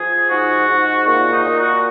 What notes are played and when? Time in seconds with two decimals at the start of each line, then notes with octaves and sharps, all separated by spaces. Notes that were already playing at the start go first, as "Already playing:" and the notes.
Already playing: F3 G#4
0.29 G#2 F#4
0.67 G#2
1.06 A#2 F#4
1.32 D#4
1.45 A#2
1.58 F#4